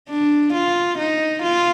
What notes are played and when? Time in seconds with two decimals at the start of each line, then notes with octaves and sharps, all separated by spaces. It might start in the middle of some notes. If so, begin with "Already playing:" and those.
0.10 D4
0.54 F4
0.98 D#4
1.43 F4